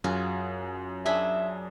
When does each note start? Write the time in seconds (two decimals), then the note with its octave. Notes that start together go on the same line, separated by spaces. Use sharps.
0.04 F#2 F4 F#4 G#4
1.06 D4 G#4 E5 B5